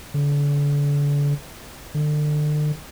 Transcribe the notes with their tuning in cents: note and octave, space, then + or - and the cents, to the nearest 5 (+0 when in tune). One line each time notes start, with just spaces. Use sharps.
D3 -35
D3 +35